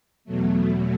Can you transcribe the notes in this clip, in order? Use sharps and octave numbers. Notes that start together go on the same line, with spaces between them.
E2 B2 F#3 A3